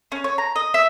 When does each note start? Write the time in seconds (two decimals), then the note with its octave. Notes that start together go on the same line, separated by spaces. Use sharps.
0.12 C#4
0.24 C#5
0.38 A#5
0.56 D#5
0.74 E5